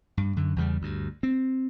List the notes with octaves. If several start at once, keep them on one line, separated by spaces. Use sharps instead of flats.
G2
F#2 D3
E2 C#3 G3
D2 G2
C4